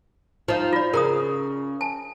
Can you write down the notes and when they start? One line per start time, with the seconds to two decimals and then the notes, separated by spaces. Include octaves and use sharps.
0.48 F3 D#4
0.73 F4 D5
0.94 C#3 A#4 A#5 D#6
1.81 G#5 A5